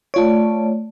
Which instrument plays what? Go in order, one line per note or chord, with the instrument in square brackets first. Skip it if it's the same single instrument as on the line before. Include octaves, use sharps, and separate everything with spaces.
[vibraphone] A3 D5 [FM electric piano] F4 C#5